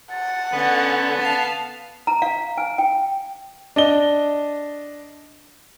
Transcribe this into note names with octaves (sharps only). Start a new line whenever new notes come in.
F#5 A6
D3 B3 C#4 B4
F5 A5
A#5
F5
G#5
G5
D4 D#5 G7